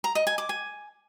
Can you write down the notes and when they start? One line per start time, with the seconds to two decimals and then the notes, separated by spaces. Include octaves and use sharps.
0.04 A#5
0.15 D#5
0.27 G#5
0.38 D6
0.49 G#5